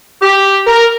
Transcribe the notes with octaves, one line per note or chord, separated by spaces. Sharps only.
G4
A#4